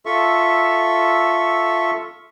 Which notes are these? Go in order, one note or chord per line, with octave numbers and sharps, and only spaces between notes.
F4 A4 E5 C#6